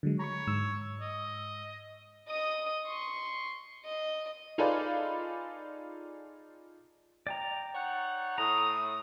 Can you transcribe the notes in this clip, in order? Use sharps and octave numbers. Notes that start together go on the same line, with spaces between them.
D3 F#3 G#3
C#5 A#5 B5 C#6
G#2 E6
D#5
D#5 D#6
C6 C#6
D#5
D#4 F4 G#4 A4 B4 D5
D5 G5 A#5
D#4 C#5 F#5
A2 A#5 D#6